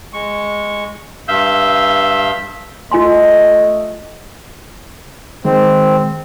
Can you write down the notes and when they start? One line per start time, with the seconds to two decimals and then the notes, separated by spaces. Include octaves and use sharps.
0.13 G#3 C#6
1.28 G2 E5 F5 E6 G6
2.91 A3 F4 D#5 G#5 C6
5.45 D#3 G#3 C4